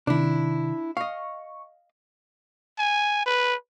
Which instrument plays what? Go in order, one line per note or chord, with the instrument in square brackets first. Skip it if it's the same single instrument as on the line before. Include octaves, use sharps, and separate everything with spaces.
[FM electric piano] C3 D#3 [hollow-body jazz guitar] D4 E4
[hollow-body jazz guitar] D#5 F5 [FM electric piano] C#6
[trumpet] G#5
B4